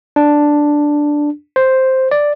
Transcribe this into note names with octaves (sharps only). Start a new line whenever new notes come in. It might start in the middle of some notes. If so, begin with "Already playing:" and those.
D4
C5
D5